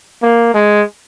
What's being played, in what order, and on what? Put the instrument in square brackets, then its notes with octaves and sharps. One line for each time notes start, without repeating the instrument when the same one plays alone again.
[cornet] A#3
G#3